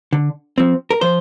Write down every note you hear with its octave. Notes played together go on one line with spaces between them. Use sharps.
D3
F3 C4
A#4
F3 C5